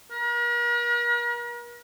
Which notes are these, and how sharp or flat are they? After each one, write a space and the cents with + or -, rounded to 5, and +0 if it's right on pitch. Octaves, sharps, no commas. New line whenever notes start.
A#4 +40